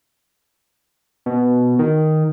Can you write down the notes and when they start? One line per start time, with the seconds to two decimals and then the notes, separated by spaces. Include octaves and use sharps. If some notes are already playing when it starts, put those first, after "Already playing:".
1.26 B2
1.79 D#3